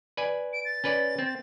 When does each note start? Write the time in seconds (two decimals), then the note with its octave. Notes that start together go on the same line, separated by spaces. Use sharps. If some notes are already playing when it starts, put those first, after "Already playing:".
0.17 B4 D5 G#5
0.53 D7
0.65 A6
0.84 C#4 B4 D5
1.19 C4